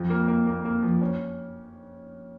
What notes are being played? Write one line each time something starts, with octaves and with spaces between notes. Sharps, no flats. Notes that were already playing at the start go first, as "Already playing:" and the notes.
Already playing: F2 F3
A#3
A#3
A#3
A#3
F3
C#4